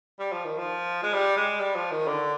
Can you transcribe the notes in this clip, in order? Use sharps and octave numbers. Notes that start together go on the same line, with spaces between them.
G3
F3
D#3
F3
G#3
G3
G#3
G3
F3
D#3
D3